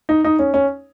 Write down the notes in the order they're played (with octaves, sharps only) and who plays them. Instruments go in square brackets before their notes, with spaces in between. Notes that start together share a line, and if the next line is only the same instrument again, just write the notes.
[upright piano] D#4
D#4
C#4
C#4